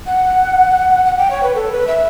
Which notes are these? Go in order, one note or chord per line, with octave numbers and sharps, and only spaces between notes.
F#5
F#5
G5
C#5
B4
A4
B4
E5